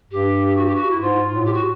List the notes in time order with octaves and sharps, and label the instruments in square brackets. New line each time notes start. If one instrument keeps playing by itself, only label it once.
[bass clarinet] G2 [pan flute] G4
[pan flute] F#4
G4
F#4
E4
[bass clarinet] G#2 [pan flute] F4
[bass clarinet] A2
[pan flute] G4
F#4